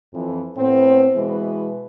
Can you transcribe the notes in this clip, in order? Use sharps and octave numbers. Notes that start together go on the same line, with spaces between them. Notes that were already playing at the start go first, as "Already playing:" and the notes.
F2 E3
A2 B3 C4
B2 E3 G#3 B4